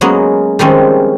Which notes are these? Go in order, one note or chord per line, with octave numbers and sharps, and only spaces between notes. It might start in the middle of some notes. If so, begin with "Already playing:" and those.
F#3 G#3 A#3 B3 C#4
D#3 F3 G3 G#3 C4 C#4